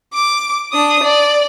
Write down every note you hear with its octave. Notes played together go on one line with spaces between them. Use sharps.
D6
D4 D#6
D5